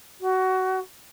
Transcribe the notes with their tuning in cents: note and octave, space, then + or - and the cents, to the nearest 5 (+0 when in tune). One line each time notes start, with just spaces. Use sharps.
F#4 +20